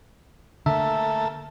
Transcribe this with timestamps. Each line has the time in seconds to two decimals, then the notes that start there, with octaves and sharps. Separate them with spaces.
0.66 D3 A3 A#3 A4 E5